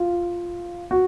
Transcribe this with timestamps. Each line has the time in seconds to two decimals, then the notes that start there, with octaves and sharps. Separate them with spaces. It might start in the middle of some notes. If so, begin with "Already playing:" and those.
Already playing: F4
0.91 F#4